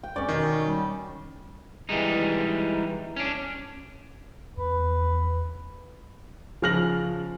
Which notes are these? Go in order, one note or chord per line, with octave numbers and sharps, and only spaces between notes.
G5
F2 C#4 C#5 D5
B2 D#3
G3
E3 G3 G#3 D#4
C#4 D4
E2 B4
C#3 F3 F6 A#6 F#7